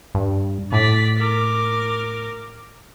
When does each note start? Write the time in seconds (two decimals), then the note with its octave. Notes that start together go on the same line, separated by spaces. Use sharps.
0.15 G2
0.72 A2 D5 B6
1.19 A#4 D6